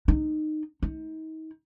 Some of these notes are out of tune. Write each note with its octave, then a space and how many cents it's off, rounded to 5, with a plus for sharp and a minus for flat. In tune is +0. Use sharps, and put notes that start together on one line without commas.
D#4 -15
D#4 +35